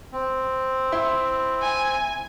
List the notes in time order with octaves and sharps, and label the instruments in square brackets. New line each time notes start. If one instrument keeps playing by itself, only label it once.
[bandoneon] C4
[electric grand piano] E4 E5 C6
[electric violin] G#5